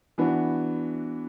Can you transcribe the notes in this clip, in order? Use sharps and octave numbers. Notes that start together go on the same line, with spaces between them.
E3 B3 D4 F#4